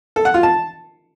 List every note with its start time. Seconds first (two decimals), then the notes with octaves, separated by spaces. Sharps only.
0.16 A4
0.25 F#5
0.34 F4
0.43 A5